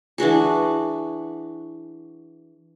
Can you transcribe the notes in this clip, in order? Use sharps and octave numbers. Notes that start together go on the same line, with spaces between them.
E3 D4 F#4 G#4